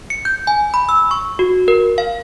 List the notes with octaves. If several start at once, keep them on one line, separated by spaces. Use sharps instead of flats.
C#7
G6
G#5
B5
E6
C#6
F#4
A#4
F5